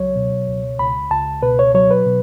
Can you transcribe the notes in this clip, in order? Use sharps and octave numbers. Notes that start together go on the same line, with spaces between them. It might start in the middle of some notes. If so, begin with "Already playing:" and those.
Already playing: C#2 F#3 C#5
B2
C#2
C#2 B5
C#2 A5
B2 B4
C#5
F#3 C#5
B4
B2